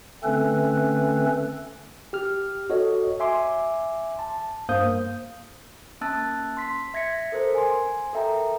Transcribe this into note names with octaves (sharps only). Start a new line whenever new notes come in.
D3 A3 C4 C#4 A4 B4
G4 F6
F#4 A4 C#5 D#5
E5 G#5 C6 D6
A5
G2 A#3 C5 F5 D#6 G6
A#3 C#4 A5 E6 F#6 A6
C6 B6
E5 G#6 A#6 B6 C#7
A4 A#4 C5
G#5 C6
A4 A#4 E5 G5 A#5